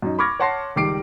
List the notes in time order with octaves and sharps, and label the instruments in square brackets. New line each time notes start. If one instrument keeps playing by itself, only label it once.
[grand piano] F#2 D#4
B5 C#6 D6 F6 G#6 A#6
C#5 F#5 A5 C6 A#6 C7
C#2 D#3 G3 D6 C7 D7